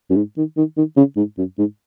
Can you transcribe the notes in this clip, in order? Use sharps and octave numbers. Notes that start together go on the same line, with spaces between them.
F#2
G#2
D#3
D#3
D#3
C#3
G#2
F#2
G#2